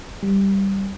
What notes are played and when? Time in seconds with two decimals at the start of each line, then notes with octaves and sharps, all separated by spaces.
0.23 G3